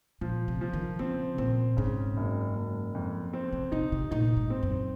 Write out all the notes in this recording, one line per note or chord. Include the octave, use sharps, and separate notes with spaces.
A#2 F3
C3
F3
D#3
C#3 C4
A#2 C4
G#2 C#3
F#1
F#1
F2
C4
C3
C3 D#4
C3
A#2 D#4
G#2
C4
F#2